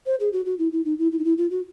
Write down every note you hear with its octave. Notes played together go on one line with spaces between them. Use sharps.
C5
G#4
F#4
F#4
E4
E4
D#4
E4
E4
D#4
E4
F4
F#4